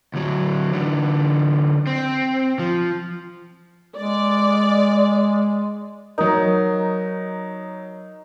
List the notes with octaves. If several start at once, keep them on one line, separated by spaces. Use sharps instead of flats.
D2 F#3
D3 E3
C4
F3
G#3 D5
F#3 D#4 A#4